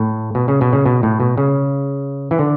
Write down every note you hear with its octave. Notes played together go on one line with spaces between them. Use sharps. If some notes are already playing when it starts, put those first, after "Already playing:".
Already playing: A2
B2
C#3
B2
C#3
B2
A2
B2
C#3
E3
D3